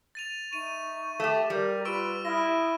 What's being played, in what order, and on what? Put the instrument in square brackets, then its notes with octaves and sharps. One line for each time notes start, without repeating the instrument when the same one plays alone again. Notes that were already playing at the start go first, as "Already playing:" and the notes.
[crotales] A6 D#7 F7
[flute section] D#4 E5 C#6 [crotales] D#7
[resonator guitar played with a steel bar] A3 G4
[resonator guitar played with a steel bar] G3 [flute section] G4 A#4 D5
[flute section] F4 B4 B5 [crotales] C#6 E6 D7
[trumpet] E4 [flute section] D#6 [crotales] F6 A#6